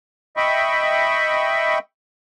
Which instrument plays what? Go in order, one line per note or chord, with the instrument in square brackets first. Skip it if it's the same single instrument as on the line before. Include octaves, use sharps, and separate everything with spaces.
[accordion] D#5 E5 G5 B5 C#6